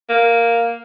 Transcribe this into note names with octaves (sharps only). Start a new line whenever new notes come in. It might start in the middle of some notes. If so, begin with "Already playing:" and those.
A#3